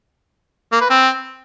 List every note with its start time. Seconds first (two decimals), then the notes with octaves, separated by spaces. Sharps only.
0.72 A#3
0.81 B4
0.90 C4